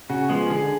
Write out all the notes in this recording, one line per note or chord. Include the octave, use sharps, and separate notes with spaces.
C#3 F#4
F3 G#3 B3 G#4
D3 G#4